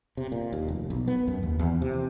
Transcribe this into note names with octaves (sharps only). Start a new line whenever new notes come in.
C3
A#2
D#2
F1
B1
B3
F#2
D#2
E2
C3